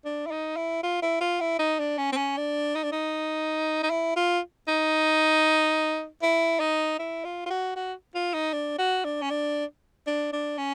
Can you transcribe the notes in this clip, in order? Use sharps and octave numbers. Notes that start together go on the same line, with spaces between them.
D4
E4
D#4
E4
F4
E4
F4
E4
D#4
D4
C#4
C4
C#4
D4
D#4
D4
D#4
D#4
E4
F4
D#4
E4
D#4
E4
F4
F4
F#4
F#4
F4
D#4
D4
F#4
D4
C#4
D4
D4
D4
C#4